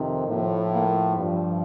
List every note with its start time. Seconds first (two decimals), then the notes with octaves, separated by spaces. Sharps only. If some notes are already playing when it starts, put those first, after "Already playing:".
Already playing: F2 C3 D#3
0.27 A2 F3 A#3
0.72 A#3
1.17 G2 F3